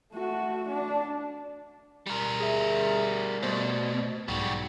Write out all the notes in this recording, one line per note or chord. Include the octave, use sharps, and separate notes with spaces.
A3 F#4
D4
G3 A#4
G#4 E5
B2 A3 C5 D5
B1 G#2 G3 F#4